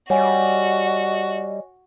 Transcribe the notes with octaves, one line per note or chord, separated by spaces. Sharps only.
G3 F#4 C#5 D#5 F#5 G#5